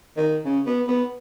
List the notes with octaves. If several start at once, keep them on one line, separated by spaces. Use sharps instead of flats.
D#3
C#3
B3
B3